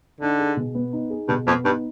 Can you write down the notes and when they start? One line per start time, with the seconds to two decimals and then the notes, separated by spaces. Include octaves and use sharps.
0.21 D3 D#4
0.38 G#4
0.56 B2
0.75 B3
0.93 D#4
1.10 G#4
1.28 G2 B2
1.47 F2 B3
1.65 G2 D#4